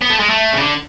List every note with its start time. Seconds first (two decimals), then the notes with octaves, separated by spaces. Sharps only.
0.02 B3
0.10 A3
0.20 G#3
0.30 A3
0.53 C#3
0.60 D3